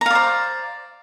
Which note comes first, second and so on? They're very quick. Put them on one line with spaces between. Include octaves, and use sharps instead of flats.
A#5 F5 D5 C5